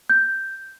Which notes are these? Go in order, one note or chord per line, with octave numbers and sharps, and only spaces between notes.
G6